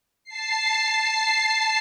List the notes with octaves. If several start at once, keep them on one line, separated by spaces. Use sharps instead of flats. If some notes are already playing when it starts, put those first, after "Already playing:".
A5 C7